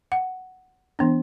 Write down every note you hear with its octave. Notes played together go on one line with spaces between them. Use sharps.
F#5
E3 B3 D4